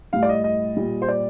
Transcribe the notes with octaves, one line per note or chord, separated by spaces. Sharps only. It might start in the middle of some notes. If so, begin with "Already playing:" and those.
A2 G3 F5
D5
D#5
D#5
A#2 G3
C5
D5